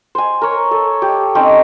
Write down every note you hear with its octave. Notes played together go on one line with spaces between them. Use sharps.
C5 G#5
A#4 C#5
A4
G4
C4 C#4 D#4 G4